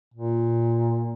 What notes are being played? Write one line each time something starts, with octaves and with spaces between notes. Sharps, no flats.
A#2